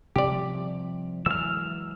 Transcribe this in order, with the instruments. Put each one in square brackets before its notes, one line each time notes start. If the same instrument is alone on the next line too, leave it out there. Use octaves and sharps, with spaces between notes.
[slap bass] C3 F3 G3 [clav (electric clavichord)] G4 D5
[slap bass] E3 F#3 G#3 [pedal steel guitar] E6 F6